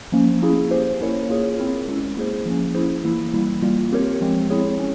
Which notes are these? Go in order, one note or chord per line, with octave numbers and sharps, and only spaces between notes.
F3 A#3 C#4
A#3 C#4 E4 G#4
C#4 G4 C5
A#3 C#4 E4 A#4 C#5
A#3 F4 G#4 C#5
C4 E4 A#4
G#3 C#4 E4
A#3 E4 G#4 C5
F3 A#3 C#4
C#4 E4 G#4 C5
E3 A#3 E4
E3 G3 A#3 E4
G3 A#3 F4
C4 G4 A#4 C#5
F3 G#3 C4
C4 E4 G#4 C#5
C#4